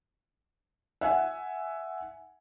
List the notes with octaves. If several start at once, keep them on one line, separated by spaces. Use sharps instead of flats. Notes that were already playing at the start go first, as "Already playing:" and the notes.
E5 F#5 G#5